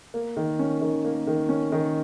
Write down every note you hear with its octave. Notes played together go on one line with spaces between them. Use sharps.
A#3
D#3
C#4
D#3
A#3
D#3
C#4
D#3